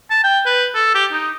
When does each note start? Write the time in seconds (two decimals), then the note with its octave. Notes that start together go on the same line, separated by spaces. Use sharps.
0.10 A5
0.23 G5
0.46 B4
0.75 A4
0.95 G4
1.12 D#4